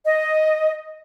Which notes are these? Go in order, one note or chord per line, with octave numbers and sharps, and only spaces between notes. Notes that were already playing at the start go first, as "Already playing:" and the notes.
D#5